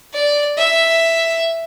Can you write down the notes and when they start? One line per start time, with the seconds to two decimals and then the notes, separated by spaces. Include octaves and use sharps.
0.14 D5
0.57 E5